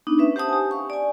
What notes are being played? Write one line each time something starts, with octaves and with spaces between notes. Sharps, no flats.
B3 D4 D#4
C#4 B4 E5
G4 C5 F#5 A5 D#6
G4 G#5
F5 C#6
D5 G#5